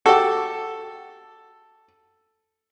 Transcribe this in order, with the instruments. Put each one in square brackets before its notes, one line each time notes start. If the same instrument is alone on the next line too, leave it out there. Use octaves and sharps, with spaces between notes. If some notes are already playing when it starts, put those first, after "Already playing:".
[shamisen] F#4 G4 [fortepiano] A4